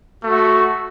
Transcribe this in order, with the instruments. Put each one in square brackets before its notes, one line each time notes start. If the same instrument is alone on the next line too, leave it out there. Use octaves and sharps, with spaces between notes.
[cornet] A3 [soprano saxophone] F#4